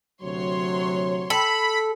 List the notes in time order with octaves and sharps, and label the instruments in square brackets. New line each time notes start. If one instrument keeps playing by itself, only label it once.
[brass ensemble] D2 C3 F#3 [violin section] C#5 C6
[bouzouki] A4 [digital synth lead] B5